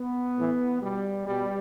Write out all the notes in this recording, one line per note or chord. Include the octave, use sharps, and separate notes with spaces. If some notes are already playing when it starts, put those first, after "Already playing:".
Already playing: B3
A2 E3
B2 G3
B2 G3